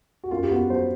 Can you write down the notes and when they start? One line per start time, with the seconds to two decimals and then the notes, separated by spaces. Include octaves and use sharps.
0.24 F#4
0.31 F#2 F4
0.43 G4
0.51 B3 F#4
0.70 F#3 C5